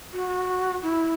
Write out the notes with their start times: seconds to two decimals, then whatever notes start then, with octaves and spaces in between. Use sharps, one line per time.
0.13 F#4
0.83 E4